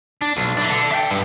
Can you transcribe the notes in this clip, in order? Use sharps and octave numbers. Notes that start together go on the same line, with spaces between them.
D4
B1
E3 D4
D4 A4
E5 G5
G2